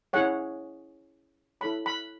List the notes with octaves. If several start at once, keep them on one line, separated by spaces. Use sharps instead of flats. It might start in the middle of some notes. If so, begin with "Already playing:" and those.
C#4 E4 G#4 C#5 F#5
E4 A4 C#5 B5
B5